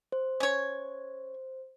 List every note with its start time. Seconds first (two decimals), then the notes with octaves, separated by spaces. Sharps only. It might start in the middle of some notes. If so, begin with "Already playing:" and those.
0.12 C5
0.40 C#4 C#5